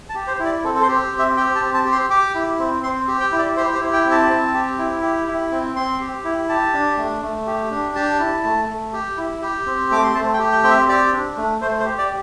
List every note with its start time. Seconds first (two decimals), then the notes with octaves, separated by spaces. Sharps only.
0.09 A5
0.15 G4
0.27 C5
0.40 E4
0.45 D5
0.64 C4 A4
0.75 A4
0.82 C5
0.89 G4
1.13 C4
1.19 E5
1.37 G4 G5
1.55 A5
1.62 C4
1.74 A5
1.86 G4
1.92 C6
2.10 G4 D6
2.35 E4
2.59 C4
2.83 C4 C6
3.08 G4
3.20 G5
3.32 E4
3.39 D5
3.57 G4 C5
3.75 C5
3.80 E4
3.93 G5
4.06 C4
4.11 A5
4.30 C4
4.54 G4
4.79 E4
5.03 G4
5.28 E4
5.52 C4
5.76 C4 C6
6.00 G4
6.25 E4
6.49 G4 A5
6.74 D4
6.98 A3
7.22 A3
7.47 G4
7.71 D4
7.95 G4 A5
8.20 E4
8.44 A3
8.69 A3
8.93 G4
9.17 E4
9.42 G4
9.66 C4
9.91 A3 D6
10.04 C6
10.15 A3 A5
10.34 G5
10.39 G4
10.52 G5
10.64 C4 G5
10.70 E5
10.88 G4 D5
11.13 D4
11.37 A3
11.61 A3 C5
11.80 C5
11.85 G4
11.98 D5